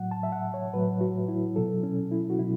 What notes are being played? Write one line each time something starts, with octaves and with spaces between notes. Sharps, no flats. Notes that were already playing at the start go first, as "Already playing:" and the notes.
Already playing: A2 F#3 F#5
A5
E5
F#5
C#5
A2 F#3 B4
F#4
E4
B2 F#3 A4
C#4
E4
F#4
B2 F#3 E4